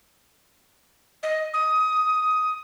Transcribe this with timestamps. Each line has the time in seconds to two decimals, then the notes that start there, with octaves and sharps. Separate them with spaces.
1.23 D#5
1.54 D#6